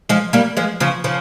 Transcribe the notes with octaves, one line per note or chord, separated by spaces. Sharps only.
F3 G#3
G3 A#3
F3 G#3
C#3 F3
C#3 F3